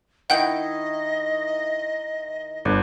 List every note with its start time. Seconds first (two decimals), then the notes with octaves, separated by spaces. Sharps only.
0.30 D#3 E4 D#5 F#5 G5 G6
2.65 G1 D4